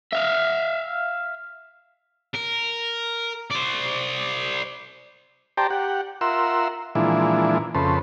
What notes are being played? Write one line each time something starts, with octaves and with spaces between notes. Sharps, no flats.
E5 F5
A#4
C5 D5
G4 C5 D5 G5 A5 A#5
G4 F#5
F4 A#4 E5 F#5 C6 E6
A#2 E3 F3 G#3 D4 E4
F2 C#3 A4 B4 C5